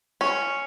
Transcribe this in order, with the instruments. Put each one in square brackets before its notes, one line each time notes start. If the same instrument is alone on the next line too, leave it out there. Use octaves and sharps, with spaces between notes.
[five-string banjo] C#4